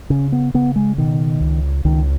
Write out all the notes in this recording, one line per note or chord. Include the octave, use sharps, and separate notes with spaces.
C#3 C#4
B3
C#3 B3
G#3
B2 D#3
C#2
C#2 D#3